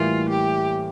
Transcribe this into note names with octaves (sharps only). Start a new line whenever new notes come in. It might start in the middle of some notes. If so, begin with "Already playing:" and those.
Already playing: A2 E3 G3 A#3 F4
G4